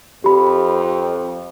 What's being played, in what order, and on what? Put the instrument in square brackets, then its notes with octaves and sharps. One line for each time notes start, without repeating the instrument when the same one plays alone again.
[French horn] F2 [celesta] G4 B5